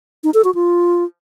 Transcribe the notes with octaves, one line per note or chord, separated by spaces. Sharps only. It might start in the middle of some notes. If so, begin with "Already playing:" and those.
D#4
A4
F#4
F4